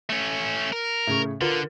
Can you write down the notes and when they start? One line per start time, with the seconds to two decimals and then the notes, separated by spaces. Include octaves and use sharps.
0.10 A3 C#4
0.72 A#4
1.07 A2 C#3 C#6
1.41 D3 F4 A#4 B4